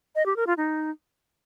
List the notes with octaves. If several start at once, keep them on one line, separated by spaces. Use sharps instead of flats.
D#5
G4
A#4
F4
D#4